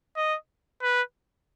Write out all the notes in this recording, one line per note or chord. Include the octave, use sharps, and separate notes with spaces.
D#5
B4